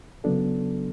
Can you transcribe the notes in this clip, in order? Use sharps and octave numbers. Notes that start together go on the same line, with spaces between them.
C#3 F#3 B3 D4 A4